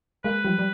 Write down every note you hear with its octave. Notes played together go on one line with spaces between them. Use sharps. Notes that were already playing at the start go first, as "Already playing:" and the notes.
G#3 A#3 B4
F3 G3
G3